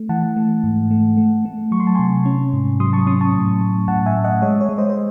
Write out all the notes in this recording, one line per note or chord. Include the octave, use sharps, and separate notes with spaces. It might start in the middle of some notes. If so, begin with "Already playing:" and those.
Already playing: A3
E3 F#5 A5
A3
G#2
A3
A3
A3
F#3 C#6
C6
A5
C3 G#5 C6
C#4
G#2
F#3 C6 D#6
A5 C#6
C#4 C6 D#6
A5 C#6
A2
A2
A2 F#5 A5
E5 G#5
A2
D#5 F#5
G#3 C#5 E5
C#5
G#3
C5 D#5
C5